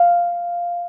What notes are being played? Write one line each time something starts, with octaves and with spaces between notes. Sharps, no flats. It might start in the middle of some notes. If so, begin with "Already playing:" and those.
Already playing: F5